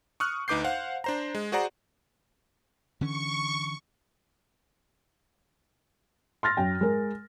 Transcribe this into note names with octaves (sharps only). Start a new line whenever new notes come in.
C#6 D#6 F6 F#6
D2 D#4 B4 D6 G6 C7
C5 F5 F#5
D4 C5 A#5
G#3
F#4 G#4 C5 D5 F#5 A#5
D3 E3 C#4 C#6
C6 F6 A6 A#6
F#2 G5
G#3 A#4